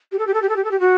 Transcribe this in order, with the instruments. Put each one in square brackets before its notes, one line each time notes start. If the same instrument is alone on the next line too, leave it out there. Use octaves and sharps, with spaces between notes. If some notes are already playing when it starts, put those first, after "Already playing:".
[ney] G4
A4
G4
A4
G4
A4
G4
A4
G4
F#4